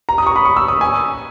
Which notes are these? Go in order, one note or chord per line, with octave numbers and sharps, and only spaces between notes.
A#5
D#6
C#6
B5
C#6
E6
D#6
G#5